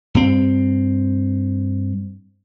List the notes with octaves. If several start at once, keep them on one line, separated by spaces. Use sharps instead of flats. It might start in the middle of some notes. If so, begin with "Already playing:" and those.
G2 C4